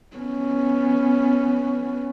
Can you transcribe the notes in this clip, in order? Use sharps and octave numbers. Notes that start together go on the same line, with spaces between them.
B3 C#4